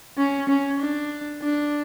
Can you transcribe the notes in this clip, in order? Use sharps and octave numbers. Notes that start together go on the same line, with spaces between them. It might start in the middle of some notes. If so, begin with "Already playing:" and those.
C#4
C#4
D4
D4